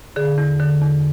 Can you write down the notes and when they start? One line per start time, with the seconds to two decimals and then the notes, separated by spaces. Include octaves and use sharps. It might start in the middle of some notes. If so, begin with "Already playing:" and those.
0.16 D3 G#4
0.38 E2
0.60 D3
0.81 E2